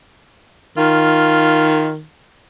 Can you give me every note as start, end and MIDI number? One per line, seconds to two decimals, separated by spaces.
0.77 2.02 51
0.77 1.89 65